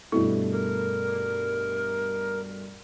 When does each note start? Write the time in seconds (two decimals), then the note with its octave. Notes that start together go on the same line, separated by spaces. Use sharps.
0.12 G2 B2 A3 E4
0.52 A#4